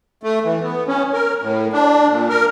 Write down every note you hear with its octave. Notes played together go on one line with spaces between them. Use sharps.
A3
E3
B3
C#4
A#4
A2
D4
A#2
A#4